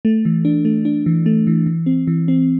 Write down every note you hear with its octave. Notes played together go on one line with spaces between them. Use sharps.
A3
E3
D4
A3
D4
E3
A3
E3
E3
C4
E3
C4